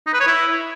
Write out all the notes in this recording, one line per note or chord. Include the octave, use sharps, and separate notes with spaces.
D#4
B4
C#5
E4